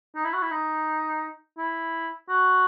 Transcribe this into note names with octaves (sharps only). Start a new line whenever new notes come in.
D#4
E4
F#4
E4
D#4
E4
F#4